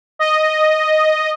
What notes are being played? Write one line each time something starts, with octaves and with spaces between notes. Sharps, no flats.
D#5